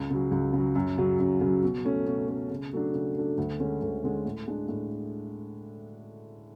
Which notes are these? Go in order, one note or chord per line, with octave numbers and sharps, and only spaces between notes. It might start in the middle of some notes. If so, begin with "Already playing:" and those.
Already playing: C#2
C#3 F#3
C#2
C#3
F#3
F#2
C#3 F#3
F#2
C#3 F#3
B2
A3 C#4
B2
A3 C#4
C#3
F#3 A3 D4
C#3
F#3 A3 D4
D2
D3 G#3 C#4
D2
D3 G#3 C#4
A2
G#3 D4
A2